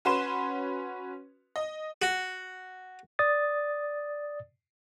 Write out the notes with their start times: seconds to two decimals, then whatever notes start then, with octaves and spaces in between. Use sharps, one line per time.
0.05 C#4 F#4 B4 C6 E7
1.56 D#5
2.02 F#4
3.19 D5 D#6 A6